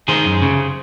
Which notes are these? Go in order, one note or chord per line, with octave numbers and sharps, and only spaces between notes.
D#3 G#4 C5
F#2
C#3